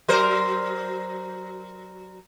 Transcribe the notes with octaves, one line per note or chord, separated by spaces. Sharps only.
F#3 A#4 C5